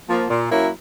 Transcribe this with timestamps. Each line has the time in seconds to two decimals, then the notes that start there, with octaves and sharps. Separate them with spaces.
0.08 F3 A#3
0.29 A#2
0.51 F#3 A#3 C#4 E4